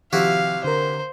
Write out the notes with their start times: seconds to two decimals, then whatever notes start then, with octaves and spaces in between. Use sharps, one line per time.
0.13 C3 D#3 F3 E4 F#4 G4 F5
0.64 D3 A#4 C5